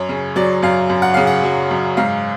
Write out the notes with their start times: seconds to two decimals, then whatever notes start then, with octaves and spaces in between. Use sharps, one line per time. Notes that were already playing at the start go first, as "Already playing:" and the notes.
Already playing: F#2 C#5
0.09 C#3
0.36 F#3 D5
0.63 F#2 F5
0.90 F#2
1.02 F#5
1.14 C#3 F5
1.27 F#5
1.43 F#3
1.71 F#2
1.97 G#2 F5